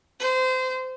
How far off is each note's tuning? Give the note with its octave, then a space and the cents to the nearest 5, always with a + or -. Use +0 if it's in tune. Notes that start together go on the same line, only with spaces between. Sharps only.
C5 -25